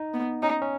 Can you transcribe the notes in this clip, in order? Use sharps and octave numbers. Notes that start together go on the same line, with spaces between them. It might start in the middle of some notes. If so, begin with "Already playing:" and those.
Already playing: D#4
B3
C#4 D#4
C#4